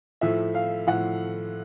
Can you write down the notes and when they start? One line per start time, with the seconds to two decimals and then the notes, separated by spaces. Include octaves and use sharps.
0.21 A2 F3 A3 E5
0.55 F5
0.87 A2 F3 A3 F#5